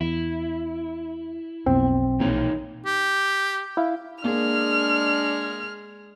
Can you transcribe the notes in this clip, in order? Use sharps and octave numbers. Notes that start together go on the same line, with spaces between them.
E2 E4
B1 F2 B3 C4
A#1 E3 A#3 D#4 C#5
G4
E4 F5
G#3 A#3 D4 G#4 F6